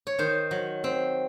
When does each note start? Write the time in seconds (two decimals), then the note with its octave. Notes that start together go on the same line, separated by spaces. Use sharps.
0.07 C#5
0.19 D#3 C5
0.51 F#3
0.84 C4